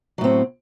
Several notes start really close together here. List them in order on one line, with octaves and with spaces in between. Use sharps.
F#3 A2 C4